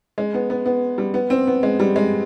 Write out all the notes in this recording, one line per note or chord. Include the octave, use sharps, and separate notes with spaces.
G#3
B3
B3
B3
G3
B3
C4
B3
G#3
G3
G#3